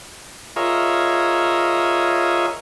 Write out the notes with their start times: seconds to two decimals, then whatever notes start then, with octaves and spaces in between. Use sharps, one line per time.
0.56 F4 G#4 A#4 C#5 D#5 E5